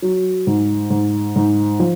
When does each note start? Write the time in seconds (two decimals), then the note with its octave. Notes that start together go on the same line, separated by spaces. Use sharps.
0.02 F#3
0.47 G#2
0.90 G#2
1.36 G#2
1.80 F3